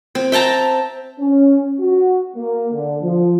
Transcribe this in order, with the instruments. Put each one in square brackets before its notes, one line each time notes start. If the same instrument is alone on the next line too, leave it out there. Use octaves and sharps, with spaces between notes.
[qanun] C4
E5 G5 A5 A#5
[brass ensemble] C#4
F#4
A#3
D3
F3